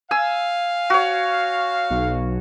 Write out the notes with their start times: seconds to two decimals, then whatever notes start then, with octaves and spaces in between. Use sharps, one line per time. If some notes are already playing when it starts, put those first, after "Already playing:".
0.11 F5 G#5 E6
0.90 F#4 C#5
1.90 B1